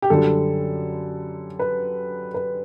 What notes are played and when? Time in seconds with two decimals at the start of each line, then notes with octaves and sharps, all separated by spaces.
0.02 G4
0.10 F#2 D3 G3 A4
1.59 B4
2.34 B4